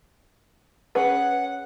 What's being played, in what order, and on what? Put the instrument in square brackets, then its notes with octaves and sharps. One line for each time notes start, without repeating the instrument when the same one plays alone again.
[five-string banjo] C#4 G#4 B4 [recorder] F#5